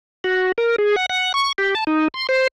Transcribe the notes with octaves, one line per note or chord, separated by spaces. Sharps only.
F#4
A#4
G#4
F#5
F#5
C#6
G4
A5
D#4
C6
C5